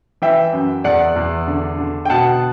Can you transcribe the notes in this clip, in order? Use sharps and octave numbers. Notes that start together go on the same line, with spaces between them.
E3 E5 G5
F#2
E2 D5 F#5
E2
D3
D3
G5
B2 F#5 A5